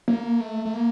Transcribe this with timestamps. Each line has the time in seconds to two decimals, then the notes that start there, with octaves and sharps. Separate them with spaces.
0.08 A#3
0.41 A3
0.65 A3
0.73 A#3